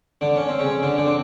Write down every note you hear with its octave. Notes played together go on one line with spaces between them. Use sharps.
D3 D4
C#4
C4
C#3 C#4
D3 D4
D3 D4
C4